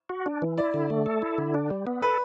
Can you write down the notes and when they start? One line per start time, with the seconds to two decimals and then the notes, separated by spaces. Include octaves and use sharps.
0.10 F#4
0.26 D4
0.42 E3
0.58 E4 D5
0.74 D3
0.90 A3
1.06 A4
1.22 E4
1.38 D3
1.54 D4
1.70 G3
1.87 B3
2.02 A4 B4